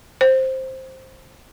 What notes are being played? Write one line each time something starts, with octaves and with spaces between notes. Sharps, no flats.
C5